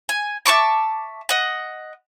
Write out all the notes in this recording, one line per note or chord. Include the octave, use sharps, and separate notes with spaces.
G#5
E5 A5 C#6 D6
D#5 F#5